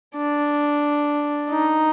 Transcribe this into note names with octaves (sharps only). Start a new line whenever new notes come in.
D4
D#4